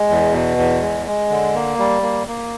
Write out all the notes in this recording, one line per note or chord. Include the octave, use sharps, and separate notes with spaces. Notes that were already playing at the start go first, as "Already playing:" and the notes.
Already playing: G#3
E2
B2
E2
G#3
G#3
D3
A#3
G3
A#3
A#3